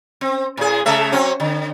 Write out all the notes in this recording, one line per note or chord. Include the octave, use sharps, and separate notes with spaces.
C4
A2 G#4
C#3 G#3 E5
F#3 C4 C#4
D3